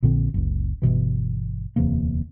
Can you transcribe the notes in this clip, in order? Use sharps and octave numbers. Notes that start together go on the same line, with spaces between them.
A#1 A#2 D3 C4
F#1 C#2
G1 C#2 B2 E3
D1 E2 C3 A#3